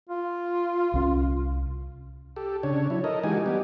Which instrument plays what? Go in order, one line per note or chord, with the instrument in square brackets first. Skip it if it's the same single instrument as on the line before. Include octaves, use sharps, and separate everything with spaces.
[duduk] F4
[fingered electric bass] C2 C#4
[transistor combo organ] G4 A4
C#3 D4 C#5
F#3 E4
A4 A#4 D#5
E3 G#3 D#4 F#4 G4 G#5
G3 B3 G4